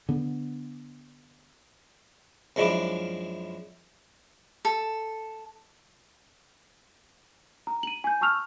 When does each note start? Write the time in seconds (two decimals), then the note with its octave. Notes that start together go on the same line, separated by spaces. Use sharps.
0.09 D3 B3
2.56 F#2 F3 G#3 D4 E4 D6
4.65 A4
7.67 A#5
7.83 D#7 F#7
8.04 G#5 G6
8.21 A5 C#6 E6 F6 F7